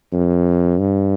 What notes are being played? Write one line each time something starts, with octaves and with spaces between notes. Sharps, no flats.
F2
G2